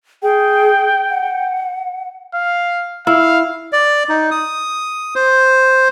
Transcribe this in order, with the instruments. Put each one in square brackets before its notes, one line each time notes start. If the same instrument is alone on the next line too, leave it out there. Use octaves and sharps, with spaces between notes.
[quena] G#4 [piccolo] G5
[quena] F#5
[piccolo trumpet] F5
[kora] E4 [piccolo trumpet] F5
[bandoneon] D5
D#4
D#6
C5